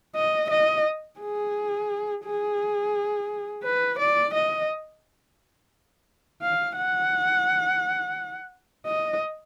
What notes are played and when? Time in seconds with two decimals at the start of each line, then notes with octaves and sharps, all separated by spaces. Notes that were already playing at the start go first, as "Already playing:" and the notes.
0.16 D#5
0.50 D#5
1.20 G#4
2.25 G#4
3.63 B4
3.99 D5
4.34 D#5
6.42 F5
6.77 F#5
8.86 D#5